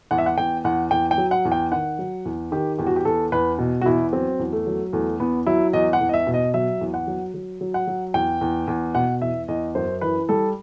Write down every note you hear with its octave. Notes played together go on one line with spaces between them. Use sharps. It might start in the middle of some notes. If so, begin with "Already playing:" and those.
E2 F#5
E5
F#5
E2 G5
E2 F#5
E2 G5
G5
F#3
F#5
E2
G5
D#3 F#5
F#3
E2
D#3 G4
E2 G4
F#4
G4
E2 A4
E2 B4
B2
F#4
E2 E4
F#3 C4
E2
A3
F#3
E2 A3
E2 B3
F#3 E4
E2 D#5
F#5
E2
D#5
E5
B2
D#5
F#3 E5
E2
F#5
F#3
F#3
F#3
F#5
F#3
E2 G5
E2
E2
B2 F#5
E2 E5
E2 D#5
F#2 C5
E3 B4
G3 A4